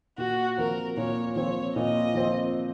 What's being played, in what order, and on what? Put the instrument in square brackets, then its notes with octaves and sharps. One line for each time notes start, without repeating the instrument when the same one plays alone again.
[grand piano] A#2 [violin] F#4
[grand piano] F3 C4 [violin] A#4
[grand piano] A#2 [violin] C#5
[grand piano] F3 C4 [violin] C#5
[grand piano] A#2 [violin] D#5
[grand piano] F3 C4